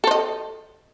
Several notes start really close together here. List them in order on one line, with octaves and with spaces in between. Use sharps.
A4 C5 D#5